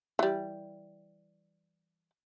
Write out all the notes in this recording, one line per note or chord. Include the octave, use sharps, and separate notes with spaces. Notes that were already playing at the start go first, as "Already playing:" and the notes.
E3 G3